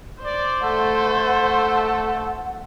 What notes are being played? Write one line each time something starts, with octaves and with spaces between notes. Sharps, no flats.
C5 D5
A3 A4 F#5